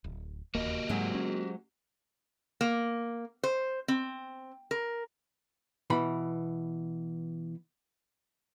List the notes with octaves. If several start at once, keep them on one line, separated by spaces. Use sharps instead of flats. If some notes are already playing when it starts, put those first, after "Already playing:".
D1
E1 D#2 A#3 F#4 G4 D#5
G#2 F#3 G#3 C4
C#4
A#3
C5
C4
A#4
B2 E3 B5